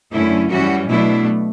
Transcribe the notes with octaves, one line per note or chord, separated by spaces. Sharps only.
F#2 D3 A3 C#4 E4
F#2 E3 G3 C#4 F#4
B2 F#3 A3 D4 E4